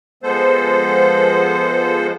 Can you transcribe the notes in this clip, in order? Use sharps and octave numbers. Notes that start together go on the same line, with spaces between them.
F3 G#3 B3 A4 C5